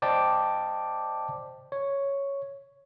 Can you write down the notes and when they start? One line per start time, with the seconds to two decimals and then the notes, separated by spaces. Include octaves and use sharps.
0.02 C5 D5 D#5 G5 A5 D6
1.72 C#5